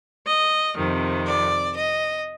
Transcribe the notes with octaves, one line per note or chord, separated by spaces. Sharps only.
D#5
F2 C3 D#3
D5
D#5